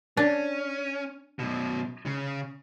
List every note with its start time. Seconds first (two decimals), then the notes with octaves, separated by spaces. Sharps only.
0.17 C#4 D4
1.39 F#2 B2
2.06 C#3